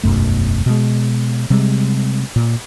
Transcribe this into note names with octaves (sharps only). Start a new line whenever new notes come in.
E1 B1 F#2 A3
B2 G#3
C3 G3 G#3
A#2